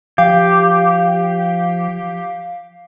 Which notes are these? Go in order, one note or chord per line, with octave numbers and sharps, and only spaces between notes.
F3 G4 F5